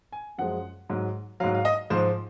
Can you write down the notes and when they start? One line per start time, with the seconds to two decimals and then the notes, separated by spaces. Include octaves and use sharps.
0.12 G#5
0.38 F#2 F3 G#3 F#5
0.89 G#2 F#3
1.40 F#3 F5
1.44 G#2
1.55 F5
1.65 D#5
1.90 G#2 F3 G#3 C5